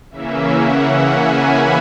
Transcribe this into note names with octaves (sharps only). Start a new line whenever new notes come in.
C#3 E3 A#3 C#4 E5
F#5
G#5
B5